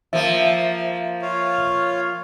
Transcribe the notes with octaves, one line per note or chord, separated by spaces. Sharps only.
F3 A#3 E5
F4 C#5 F5